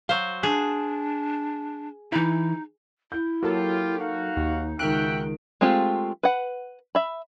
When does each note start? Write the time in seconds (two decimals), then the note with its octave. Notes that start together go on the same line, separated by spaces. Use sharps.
0.09 F#3 C5 F5
0.43 D4 G#4
2.12 E3 D#4 E4
3.12 E4 G6
3.43 F#3 A#3 F4 G4 A4
3.99 D#4 F#4 F5
4.37 D#2
4.79 C#2 D#3 F#4 E5 G5 F6 F#6 D7
5.61 G#3 A3 C4 F4 G4
6.23 B4 F#5
6.95 E5 B5